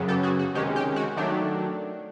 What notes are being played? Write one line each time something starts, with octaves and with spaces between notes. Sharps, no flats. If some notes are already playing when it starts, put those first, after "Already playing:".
Already playing: F#2 C#3 F#3 B3
G4 A4
F#4 G#4
F#4
C3 D#3 G#3 C#4 G4
G4
F#4
D#3 F#3 A3 D4 G4